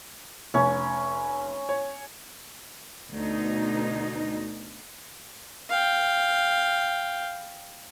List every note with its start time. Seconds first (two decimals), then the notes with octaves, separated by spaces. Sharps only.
0.54 F1 C#4
1.69 C#5
3.12 D2 B2 D#4
5.70 F5 G5